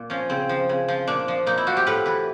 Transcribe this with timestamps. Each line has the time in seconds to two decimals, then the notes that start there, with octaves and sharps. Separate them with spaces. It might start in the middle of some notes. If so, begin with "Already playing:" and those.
Already playing: A#2
0.10 F3 C#4
0.30 C#3 C4
0.49 F3
0.69 C#3
0.88 F3
1.07 A#2 D4
1.28 F3
1.46 A#2 D#4
1.58 E4
1.67 F3 F#4
1.77 G4
1.87 A2 B4
2.06 E3 B4